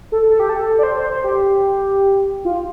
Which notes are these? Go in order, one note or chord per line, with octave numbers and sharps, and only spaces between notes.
A4
A4
G4
A4
D5
C5
C5
C5
G4
F4